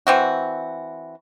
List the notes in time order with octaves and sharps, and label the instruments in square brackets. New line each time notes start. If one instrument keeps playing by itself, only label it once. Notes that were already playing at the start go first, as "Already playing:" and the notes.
[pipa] E3 C4 F#4